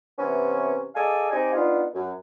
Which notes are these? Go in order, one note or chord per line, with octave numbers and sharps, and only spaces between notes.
C3 E3 B3 C#4
G#4 A4 D5 D#5 F5 G#5
C4 D#4 G4 D5 G5 G#5
B3 D4 D#4 F4
F#2